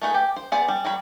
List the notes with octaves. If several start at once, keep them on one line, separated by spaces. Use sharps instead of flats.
A3 D#4 G#4 A4 B4
G4
C5
B3 G#4 C5 D5
G3
F#3 G3 B5